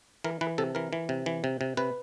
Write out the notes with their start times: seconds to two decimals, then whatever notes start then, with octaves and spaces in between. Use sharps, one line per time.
0.24 E3 A#4
0.41 E3 B4
0.58 C3 A4
0.75 E3 A#4
0.93 E3
1.09 C3
1.26 E3
1.44 C3
1.61 C3
1.77 C3 B4